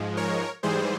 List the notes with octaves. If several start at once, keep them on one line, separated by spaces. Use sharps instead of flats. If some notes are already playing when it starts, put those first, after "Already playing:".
Already playing: G#2 F3 G#3
A#4 C#5
G#2 E3 G3 G#4 C5